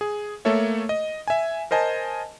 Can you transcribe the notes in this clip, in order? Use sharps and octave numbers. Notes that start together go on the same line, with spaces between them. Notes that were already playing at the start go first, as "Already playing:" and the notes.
G#4
A3 A#3 A4 C#5 E5
D#5
E5 G#5
A#4 C5 D#5 G#5 A5